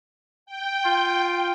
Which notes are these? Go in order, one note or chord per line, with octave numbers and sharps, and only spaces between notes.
G5
F4